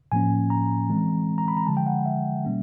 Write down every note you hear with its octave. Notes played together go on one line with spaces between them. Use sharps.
A2 F3 A#3 C#4 G#5
A#5
E3 G#3 C4
A#5
B5
A#5
D3 F3 G#3 A5
G5
F#5
E5
B2 G3 A#3 C#4